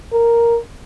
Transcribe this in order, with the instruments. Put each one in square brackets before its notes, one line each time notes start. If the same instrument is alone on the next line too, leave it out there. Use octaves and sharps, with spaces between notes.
[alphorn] A#4